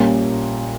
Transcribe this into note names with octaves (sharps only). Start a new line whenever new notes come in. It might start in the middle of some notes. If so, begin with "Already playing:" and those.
Already playing: A#1 A#2 G3 C#4 F4